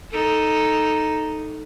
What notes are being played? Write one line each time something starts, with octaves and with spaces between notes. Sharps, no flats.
D#4 A4